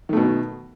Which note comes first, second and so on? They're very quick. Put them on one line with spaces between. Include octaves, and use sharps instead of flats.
D#3 A3 B2